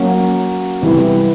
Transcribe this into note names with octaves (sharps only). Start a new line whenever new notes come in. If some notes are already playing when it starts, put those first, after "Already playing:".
Already playing: F#3 A#3 C#4 F#4
C3 E3 G3 B3 E4